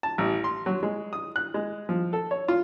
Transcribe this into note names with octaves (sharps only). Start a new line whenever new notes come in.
A5
A1
C6
F#3
G#3
D#6
F#6
G#3
F3
A4
C#5
F4